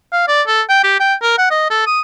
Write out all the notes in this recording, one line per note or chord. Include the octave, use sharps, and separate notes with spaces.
F5
D5
A4
G5
G4
G5
A#4
F#5
D#5
A4
D#6